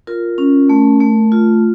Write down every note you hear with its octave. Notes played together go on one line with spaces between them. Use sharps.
F4 A#4
C#4
A3
A3
F4